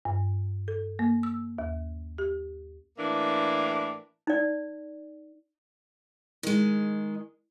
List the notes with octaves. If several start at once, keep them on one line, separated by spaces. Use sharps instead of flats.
G2
A4
A#3
E6
D#2
G4
A2 E3 A#3 D4
D#4 D5
D#3 G#3